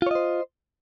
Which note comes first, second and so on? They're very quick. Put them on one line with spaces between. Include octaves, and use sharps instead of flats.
F4 C#5 D#5 C5